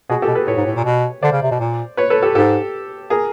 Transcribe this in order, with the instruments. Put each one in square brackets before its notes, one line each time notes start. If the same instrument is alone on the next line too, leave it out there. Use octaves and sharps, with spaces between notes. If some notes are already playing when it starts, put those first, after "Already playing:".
[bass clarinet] B2 [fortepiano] F#4 G#4
[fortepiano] G4 A4
[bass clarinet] B2
[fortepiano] A4 B4
[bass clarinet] A2 [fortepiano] B4 C#5
[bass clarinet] G#2
A2
A#2
B2
[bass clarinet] D3 [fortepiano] C5 D5
[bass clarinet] C#3
C3
B2
A#2
[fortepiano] B4 C#5
A4 B4
G4 A4
[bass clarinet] G#2 [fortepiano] G4 A4
[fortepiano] G#4 A#4